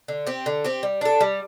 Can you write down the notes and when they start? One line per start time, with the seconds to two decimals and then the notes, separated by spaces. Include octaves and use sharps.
0.08 D3
0.27 C4 G4
0.46 D3
0.64 C4 G4
0.83 G3
1.01 D4 A4
1.21 G3